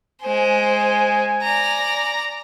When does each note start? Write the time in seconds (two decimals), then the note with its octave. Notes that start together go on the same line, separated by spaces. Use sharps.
0.22 G#3 C5 G#5
1.42 D5 A#5